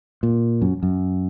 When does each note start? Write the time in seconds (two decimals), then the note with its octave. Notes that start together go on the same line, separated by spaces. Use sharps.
0.23 A#2
0.62 F#2
0.83 F#2